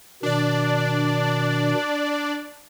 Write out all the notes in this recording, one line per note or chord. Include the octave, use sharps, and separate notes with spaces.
B2 D#3 D4 D5